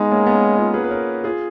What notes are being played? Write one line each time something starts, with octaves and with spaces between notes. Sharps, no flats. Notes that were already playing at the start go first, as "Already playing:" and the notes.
Already playing: G#3 B3 D#4
A#3 C#4
B3
A#3 C#4
C#4 F4
G#4 B4
B4
A#4 C#5
F4 G#4